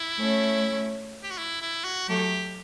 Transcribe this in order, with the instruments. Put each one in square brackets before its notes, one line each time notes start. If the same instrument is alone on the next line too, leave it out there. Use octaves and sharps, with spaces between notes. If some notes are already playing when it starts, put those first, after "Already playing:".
Already playing: [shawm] E4
[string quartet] A3 C#4
[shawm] G4
F#4
E4
E4
F#4
[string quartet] F#3 A3 [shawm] G4